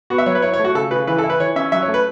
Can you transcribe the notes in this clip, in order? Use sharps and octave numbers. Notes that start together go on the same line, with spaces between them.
B3 F#4
E5
F#3 C#5
B4
E4 C#5
C#5
A3
F#4
C#3 A4
C#3 B4
E3 B4
A4
E4
B4
E3 C#5
C#4 E5
F#3 E5
C#5
A3
B4